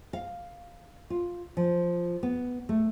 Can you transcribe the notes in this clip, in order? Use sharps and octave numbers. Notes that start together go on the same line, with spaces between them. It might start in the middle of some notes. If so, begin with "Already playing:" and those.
F5
F4
F3
B3
A3